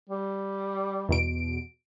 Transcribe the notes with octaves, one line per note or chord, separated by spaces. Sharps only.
G3
E2 B2 D7